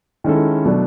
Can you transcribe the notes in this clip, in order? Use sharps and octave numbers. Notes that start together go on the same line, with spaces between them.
D#3 G#3 C#4 E4 A4
B2 F#3 A3 D4